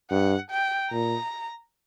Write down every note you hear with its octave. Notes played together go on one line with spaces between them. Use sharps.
G2 F#5
G5
A#2 A#5